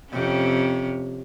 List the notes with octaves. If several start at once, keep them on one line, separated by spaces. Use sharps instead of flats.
F2 C3 C#4